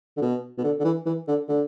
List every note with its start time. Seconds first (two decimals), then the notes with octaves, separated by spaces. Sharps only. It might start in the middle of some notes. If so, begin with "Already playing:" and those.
0.17 D3
0.22 B2
0.58 B2
0.64 D3
0.80 D3
0.84 E3
1.06 E3
1.28 D3
1.49 D3